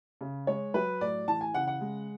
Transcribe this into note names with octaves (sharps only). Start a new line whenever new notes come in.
C#3
G#3 C#5
F#3 B4
A2 D5
E3 A5
G#5
C#3 F#5
F#5
G#3